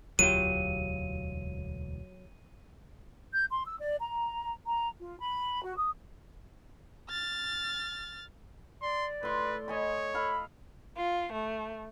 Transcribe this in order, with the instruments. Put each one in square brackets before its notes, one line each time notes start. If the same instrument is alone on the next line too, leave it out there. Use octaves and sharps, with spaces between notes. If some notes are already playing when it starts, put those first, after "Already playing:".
[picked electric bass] E1 D2 [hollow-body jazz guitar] F#3 F4 G4 [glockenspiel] D#7
[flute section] G6
C6
E6
D5
A#5
A#5
F4
B5
F#4
D#6
[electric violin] F6 A6
[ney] D5 [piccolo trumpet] C6
[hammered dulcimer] A2 C6 [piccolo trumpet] B4
[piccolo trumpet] C#5 [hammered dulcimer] D#5 G#5 B5
[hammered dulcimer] A4 F5 [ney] B5
[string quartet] F4
A3